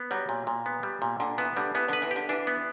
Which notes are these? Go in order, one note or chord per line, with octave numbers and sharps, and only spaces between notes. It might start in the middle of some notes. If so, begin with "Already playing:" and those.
Already playing: B3
F#3 G3
A#2
A#2
B3
G3
A#2
A#2 D3
E3 B3
D3 G3
E3 B3
D3
B4
E3
D3 G4
E3 D4
B3